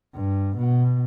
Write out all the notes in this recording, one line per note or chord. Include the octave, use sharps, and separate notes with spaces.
G2
B2